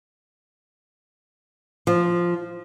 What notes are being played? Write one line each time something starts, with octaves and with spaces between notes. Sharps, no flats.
F3